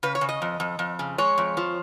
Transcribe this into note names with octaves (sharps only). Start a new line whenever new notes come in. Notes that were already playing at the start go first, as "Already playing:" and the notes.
C#3 B4
C#5
C#3
D#5
F2
F2
F2
C#3
G#3 C#5
F2
F3